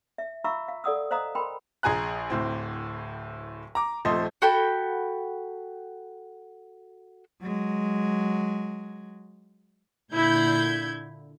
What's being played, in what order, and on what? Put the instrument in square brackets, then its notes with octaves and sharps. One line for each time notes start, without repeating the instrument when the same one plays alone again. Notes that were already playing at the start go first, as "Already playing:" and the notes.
[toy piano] E5
F4 E5 F5 A#5 C#6 E6
F5
A4 D5 F#5 D#6 E6
C5 D#5 F5 A#5 D#6
A#4 G5 B5 C6
[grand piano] A#1 G#4 G#5 A#5 F#6
D1 A2 C4
A#5 D6
D#1 F3 A3 C4 C5 D#5
[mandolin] F#4 A4 G5 B5
[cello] F#3 G#3
[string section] A#2 D3 E4 G6 G#6